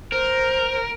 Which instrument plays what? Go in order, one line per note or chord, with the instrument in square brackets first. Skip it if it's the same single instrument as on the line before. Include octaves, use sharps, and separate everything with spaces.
[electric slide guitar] A#4 [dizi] C5